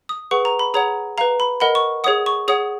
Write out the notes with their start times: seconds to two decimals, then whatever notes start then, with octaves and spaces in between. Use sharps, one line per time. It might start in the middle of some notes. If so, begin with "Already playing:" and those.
0.09 D#6
0.31 G#4 B4 F#5 C#6
0.45 A#5
0.59 B5
0.74 G#4 C#5 F#5 A#5
1.18 B4 F5 A#5
1.40 B5
1.60 A#4 D#5 F#5 B5
1.75 C#6
2.04 G#4 C#5 F#5 D#6
2.26 C#6
2.48 G#4 C#5 F#5 D#6